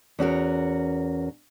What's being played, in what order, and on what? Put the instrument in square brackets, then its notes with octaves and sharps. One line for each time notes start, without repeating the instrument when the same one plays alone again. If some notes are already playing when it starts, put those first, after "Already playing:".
[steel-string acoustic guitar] E2 C#4 F#4 A#4